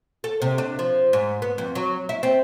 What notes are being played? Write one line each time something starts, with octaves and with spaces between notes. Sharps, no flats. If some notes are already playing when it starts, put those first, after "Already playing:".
A4
C3
D4
F3
G#2
B3
F2
F#3
E4
C4